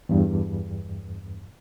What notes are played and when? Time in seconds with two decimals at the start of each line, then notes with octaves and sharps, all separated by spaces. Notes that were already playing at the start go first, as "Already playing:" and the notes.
0.09 E2 G2